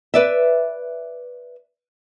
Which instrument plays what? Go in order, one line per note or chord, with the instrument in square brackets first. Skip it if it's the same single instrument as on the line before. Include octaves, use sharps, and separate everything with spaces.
[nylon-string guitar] B4 D5 E5